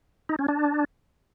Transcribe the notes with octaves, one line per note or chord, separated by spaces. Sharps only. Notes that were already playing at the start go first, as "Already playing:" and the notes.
D#4
C#4
D4